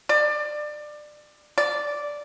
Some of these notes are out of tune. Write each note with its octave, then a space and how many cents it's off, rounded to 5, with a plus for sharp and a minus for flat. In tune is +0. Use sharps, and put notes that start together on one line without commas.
D5 +25
D5 -5